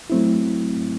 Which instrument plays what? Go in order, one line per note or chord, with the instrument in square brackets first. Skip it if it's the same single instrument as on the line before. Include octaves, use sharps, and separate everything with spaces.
[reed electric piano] F#3 A3 C4 E4